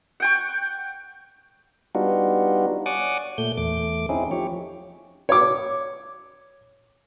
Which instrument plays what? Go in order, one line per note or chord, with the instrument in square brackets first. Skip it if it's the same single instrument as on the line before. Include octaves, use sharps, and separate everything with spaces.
[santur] F#5 G5 C#6
[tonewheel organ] G3 B3 D4 D#4 F4 F#4
C#5 D5 F#5 G#5 D6 D#6
A#2 A3 G6
E2 A3 D6
C4 C#4 D#4 E4 G#4
F3 G4 C#5
[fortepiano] C#5 D6